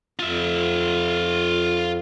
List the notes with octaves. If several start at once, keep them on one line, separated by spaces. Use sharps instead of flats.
F2 F4 E5